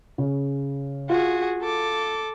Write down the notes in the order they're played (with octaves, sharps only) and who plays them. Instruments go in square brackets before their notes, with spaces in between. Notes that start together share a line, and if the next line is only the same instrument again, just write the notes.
[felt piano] C#3
[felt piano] F4 [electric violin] F#4 G#4
[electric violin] A4 D6